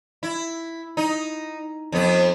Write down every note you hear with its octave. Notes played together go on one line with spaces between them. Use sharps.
E4
D#4
F2 B3